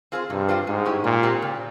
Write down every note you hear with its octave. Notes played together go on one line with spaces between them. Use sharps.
C4 F4 G#4 C5
G2 C3
G3 C4 F4 C5
G#2 G#3
C#4 E4 G4
A#2 G3
C4 G4
C#3